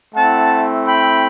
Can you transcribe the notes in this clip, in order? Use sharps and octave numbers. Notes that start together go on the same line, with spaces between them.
A3 C4 E4 F#5 A5
G5 B5